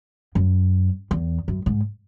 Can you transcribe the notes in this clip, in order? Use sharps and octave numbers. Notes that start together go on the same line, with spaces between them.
F#2
E2
F#2
G#2